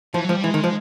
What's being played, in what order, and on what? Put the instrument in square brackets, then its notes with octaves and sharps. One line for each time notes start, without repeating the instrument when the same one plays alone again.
[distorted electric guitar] E3 [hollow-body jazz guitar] F3
[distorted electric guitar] F#3
[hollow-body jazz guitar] F3 [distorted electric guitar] G#3
[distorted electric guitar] G3
[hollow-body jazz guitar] E3 [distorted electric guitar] G#3
[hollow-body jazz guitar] D#3
F3